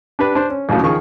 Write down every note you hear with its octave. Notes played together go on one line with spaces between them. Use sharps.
D4 G4 B4
D4 C5
C#4
A#1 D#2 A2 C#3 F#3
D#3 F3 G#4 C#6